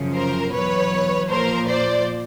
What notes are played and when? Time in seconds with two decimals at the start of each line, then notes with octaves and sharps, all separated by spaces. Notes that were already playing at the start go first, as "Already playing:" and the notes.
Already playing: F#2 C#3 F3
0.13 A#4 C5
0.52 E2 B2 F#3 B4 C#5
1.29 A#2 F3 A#4 C5
1.68 C5 D5